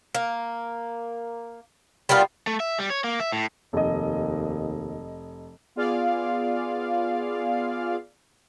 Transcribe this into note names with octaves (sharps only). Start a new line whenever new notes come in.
A#3
G3 A#3 B3 F4
A3
E5
G3
C#5
A#3
E5
A2
F1 D#2 D#5
B3 F4 G#4 D5 F5